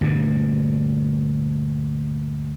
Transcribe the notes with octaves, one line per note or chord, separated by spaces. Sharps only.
D2 G2 A#2